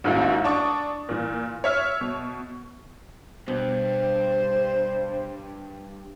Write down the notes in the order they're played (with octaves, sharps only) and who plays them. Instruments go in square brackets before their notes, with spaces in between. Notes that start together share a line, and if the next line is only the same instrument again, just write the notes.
[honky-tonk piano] A1 D#2 G#2 C#4 E4 F#4
D4 C#6 D#6
A#2 E3
C#5 E5 F6
B2
[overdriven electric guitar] G2 [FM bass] B2 [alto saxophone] C5